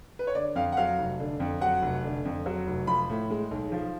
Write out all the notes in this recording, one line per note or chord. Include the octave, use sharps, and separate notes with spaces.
B4
C#5
D3 D5
F2 F5
F#5
F#3 F5
F1
D3
F2
F#3 F#5
F1
D3
F2
F#3
F1
F3 B5
A2
G#3
B1
F3